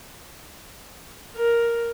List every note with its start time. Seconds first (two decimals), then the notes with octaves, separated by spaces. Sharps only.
1.35 A#4